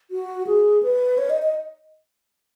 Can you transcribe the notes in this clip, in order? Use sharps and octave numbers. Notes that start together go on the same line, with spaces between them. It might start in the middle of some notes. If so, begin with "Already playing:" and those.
F#4
G#4
B4
C#5
D#5
D#5